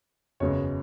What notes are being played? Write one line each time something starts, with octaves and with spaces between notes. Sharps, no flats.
F#1 E2 B2 G#3 C#5